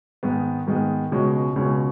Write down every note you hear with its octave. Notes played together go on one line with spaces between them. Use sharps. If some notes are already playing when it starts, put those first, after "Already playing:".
G#2 D#3 G#3 B3
G#2 D#3 G#3 B3
C#2 B2 G#3 C#4
C#2 B2 G#3 C#4